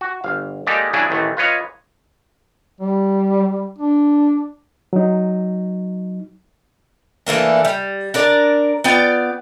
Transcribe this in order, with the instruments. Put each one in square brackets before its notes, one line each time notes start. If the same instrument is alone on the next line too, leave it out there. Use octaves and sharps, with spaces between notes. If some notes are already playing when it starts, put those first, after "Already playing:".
[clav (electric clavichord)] F#4
G1 F5
G#3 A#3 D#4 G4 A4 D5
C#3 F#3 D4 E4 G#4
A1 D#3 E3 A3
F4 B4 C#5 D#5 F5
[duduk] G3
D4
[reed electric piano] F#3 D#4
[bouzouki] E3 A3 A#3 D4
G3
D4 A#4 D5
B3 F4 D5 G5